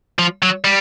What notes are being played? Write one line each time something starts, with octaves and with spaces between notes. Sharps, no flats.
F3
F#3
G3